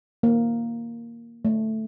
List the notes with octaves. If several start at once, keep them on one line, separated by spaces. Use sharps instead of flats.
A#3
A3